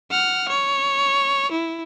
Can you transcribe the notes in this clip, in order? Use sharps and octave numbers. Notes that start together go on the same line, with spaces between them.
F#5 F6
C#5
E4